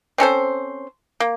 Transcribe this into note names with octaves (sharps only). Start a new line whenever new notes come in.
C4 C#4 A4 C5
A#3